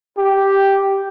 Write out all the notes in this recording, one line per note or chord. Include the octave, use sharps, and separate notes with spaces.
G4